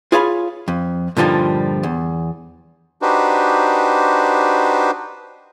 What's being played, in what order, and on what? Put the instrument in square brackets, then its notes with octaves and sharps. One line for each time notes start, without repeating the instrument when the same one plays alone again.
[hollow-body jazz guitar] F4 G#4 C#5 F5 A#5 B5
F2
G2 A#2 D3 F3 G3 D#4
E2
[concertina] D4 D#4 F#4 G4 B4 C5